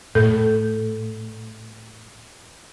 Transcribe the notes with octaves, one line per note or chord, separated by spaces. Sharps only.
A2 A4